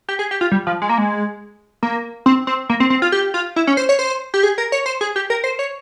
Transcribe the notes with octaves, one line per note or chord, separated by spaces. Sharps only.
G4
G#4
G4
F4
G3
F3
G#3
A#3
G#3
A#3
C4
C4
A#3
C4
C4
F4
G4
F4
E4
C#4
C5
C#5
C5
G4
G#4
A#4
C#5
C5
G#4
G4
A#4
C5
C#5